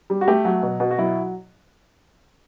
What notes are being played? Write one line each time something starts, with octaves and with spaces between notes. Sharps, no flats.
G3
F#4
A3 G4
F#3
B2
B2
F#4
F#3 E4